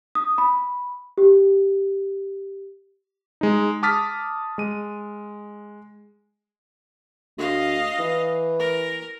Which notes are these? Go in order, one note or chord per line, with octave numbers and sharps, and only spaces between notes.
D#6
B5
G4
G#3 D#4
A5 D6 D#6 F6 A6 B6
G#3 D#7
D2 D#5 F5
E3
A#4